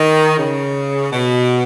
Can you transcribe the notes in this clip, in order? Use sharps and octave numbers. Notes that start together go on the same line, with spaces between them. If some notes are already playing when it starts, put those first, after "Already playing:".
Already playing: D#3
C#3
B2